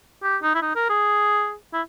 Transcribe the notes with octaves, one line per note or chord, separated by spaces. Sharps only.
G4
D#4
E4
D#4
A#4
G#4
E4